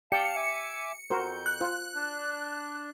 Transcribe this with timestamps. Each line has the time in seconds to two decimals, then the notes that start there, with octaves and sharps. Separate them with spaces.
0.12 G4 D5 F5 G5 A5 C#7
0.36 E5 G#5 D6
1.10 F2 F#4 A#4 C5 G6
1.46 F#6
1.61 F4 C5
1.95 D4